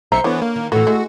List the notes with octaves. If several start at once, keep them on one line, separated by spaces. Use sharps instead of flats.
B1 C5 E5 A#5 C#7
D3 E3 B3 C#5
A#3
D#3
A2 E3 B3 F#4 A4
G#3 A3